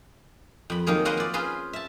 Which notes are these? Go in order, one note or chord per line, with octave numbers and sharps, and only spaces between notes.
F2 B5
D#3 F#3 A#3 G#4
A#3 F#4 G#4 B4 C5 D#5
F4 D5
C#4 F4 G#4 B4 C5
E5 A5